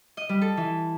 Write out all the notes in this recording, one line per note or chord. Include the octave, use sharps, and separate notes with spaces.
D#5
G3
A4
E3